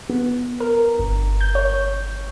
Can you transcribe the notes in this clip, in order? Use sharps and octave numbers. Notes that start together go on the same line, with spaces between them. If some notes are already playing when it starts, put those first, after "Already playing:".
B3
A#4
G1
G6
C#5